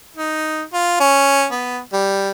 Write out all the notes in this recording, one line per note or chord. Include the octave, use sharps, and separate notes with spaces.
D#4
F4
C#4
B3
G3